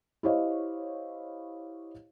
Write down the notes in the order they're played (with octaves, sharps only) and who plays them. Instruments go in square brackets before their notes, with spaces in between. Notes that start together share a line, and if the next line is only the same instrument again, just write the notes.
[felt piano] E4 G4 C5 C#5 D#5 F5